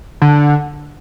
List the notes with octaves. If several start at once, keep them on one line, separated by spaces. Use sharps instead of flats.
D3